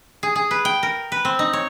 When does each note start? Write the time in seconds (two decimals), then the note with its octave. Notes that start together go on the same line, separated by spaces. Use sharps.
0.23 G#4
0.36 G#4
0.51 B4
0.65 G5
0.83 A#4
1.12 B4
1.25 C4
1.39 D#4
1.53 C#5